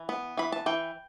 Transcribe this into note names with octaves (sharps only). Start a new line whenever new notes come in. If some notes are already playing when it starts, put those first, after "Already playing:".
Already playing: E3
B3
E3 B5
A5
E3 G5